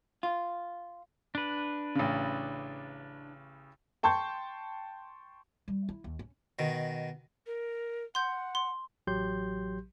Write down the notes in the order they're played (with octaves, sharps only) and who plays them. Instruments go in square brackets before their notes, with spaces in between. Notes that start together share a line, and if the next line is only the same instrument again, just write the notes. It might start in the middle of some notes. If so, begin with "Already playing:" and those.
[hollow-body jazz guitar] F4
[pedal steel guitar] D4 B4
[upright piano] A1 C#3
G5 A5 C6 C#6 G6
[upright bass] G3
E4
D#2
C#4
[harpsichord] B2 D#3
[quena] A#4
[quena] F#5 [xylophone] C6 G6
[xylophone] C6
[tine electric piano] A1 F#3 G4 C6 G6